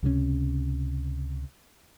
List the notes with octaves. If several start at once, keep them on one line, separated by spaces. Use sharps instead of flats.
C#2 C3 E3 C#4